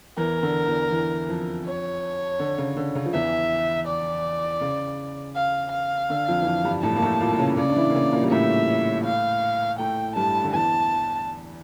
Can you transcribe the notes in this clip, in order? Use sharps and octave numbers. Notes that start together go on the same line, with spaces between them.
E2 E3 A#4
D3
E2 E3
E2 E3
F2 F3
C#5
D3
C#3
D3
C#3 C#4
F3
E2 E3 E5
D5
C#3
F5
F5
D3
F2 F3
E3
F2 F3
G2 G3
A2 A3 A5
A#3
A2 A3
A#2 A#3
A#3
C#3 C#4
C#3 C#4 D5
D4
E3 E4
A#3
C#3 C#4
A#2 A#3
G3
A2 A3 E5
F5
A2 A3 G5
G2 G3 A5
D3
E2 E3 A5